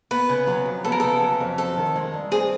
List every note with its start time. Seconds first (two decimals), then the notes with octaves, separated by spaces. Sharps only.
0.11 B3 B4
0.29 C#3
0.47 F#3
0.66 F2
0.84 B3 A4
0.92 A#4
1.00 C#3 A4
1.22 F#3
1.40 F2
1.58 C4 A4
1.77 D#3
1.96 G#3
2.14 G2
2.32 C4 G#4